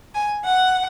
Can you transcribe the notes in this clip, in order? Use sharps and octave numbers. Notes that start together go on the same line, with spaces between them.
G#5
F#5